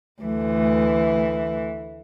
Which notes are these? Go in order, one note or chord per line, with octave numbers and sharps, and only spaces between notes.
D2 E3